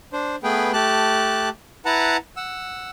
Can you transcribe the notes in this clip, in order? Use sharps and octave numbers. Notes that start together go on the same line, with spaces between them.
D4 C5
A3 B3 G#4 B4 G5
A3 G4 A5 F#6
E4 B4 F#5 A5 A#5
F#5 E6